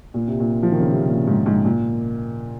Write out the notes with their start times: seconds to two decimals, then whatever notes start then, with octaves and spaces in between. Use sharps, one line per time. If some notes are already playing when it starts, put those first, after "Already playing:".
0.14 A#2
0.27 C3
0.40 A#2
0.63 F3
0.72 D#3
0.80 C#3
0.90 C3
1.08 A#2
1.27 G#2
1.46 G#2
1.64 A#2